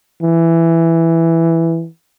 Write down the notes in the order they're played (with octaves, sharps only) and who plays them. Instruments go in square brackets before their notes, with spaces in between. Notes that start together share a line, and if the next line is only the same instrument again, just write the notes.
[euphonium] E3